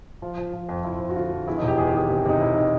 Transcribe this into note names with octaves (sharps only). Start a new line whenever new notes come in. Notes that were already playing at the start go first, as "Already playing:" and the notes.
F3 F4
F3
F3
F2
F3 E4
F2
F#4
D3 F4
F3
E2 E4
D#4
E1
G4
E2 G#4
G4
D#3 G#4
C3 G4
C3 D#4
E1 E4
D#3 D#4